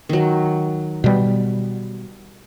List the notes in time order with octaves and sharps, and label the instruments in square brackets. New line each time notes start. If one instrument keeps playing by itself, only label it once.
[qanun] D#3 F#3
[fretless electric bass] B2 G3